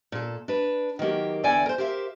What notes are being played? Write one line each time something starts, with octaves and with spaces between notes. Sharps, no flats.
A#2 A4
D4 B4
D#3 F#3 A#3 G4
E2 D3 E3 D5 G5 G#5
A#4 C5
G4 A#4 C5 E5 F5